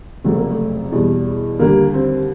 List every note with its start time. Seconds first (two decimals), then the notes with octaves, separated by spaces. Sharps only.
0.24 F1 F2 C#3 F#3 A3
0.37 A#3
0.51 A3
0.92 E2 B2 G3
1.59 D#2 D3 G3 A#3
1.94 C4